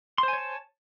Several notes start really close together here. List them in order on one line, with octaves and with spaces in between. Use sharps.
C6 C5 G#5 C#5 A5